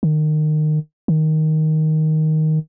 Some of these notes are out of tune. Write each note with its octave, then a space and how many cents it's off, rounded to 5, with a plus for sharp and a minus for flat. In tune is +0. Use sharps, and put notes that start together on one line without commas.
D#3 -25
D#3 +5